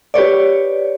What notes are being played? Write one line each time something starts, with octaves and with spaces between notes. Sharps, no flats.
G4 B4 C#5 D5